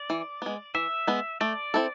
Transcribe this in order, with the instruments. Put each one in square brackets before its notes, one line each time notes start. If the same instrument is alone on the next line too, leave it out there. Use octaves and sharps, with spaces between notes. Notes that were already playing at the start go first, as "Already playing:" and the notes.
Already playing: [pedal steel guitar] D5
[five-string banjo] E3
G#3 B3
[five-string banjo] E3 [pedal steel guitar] E5
[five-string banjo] G#3 B3
[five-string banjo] A3 [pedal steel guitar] D5
[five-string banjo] C4 E4 A4